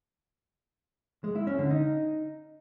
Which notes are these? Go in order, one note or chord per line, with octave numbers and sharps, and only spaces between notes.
G#3
E4
C#4
D3
D#4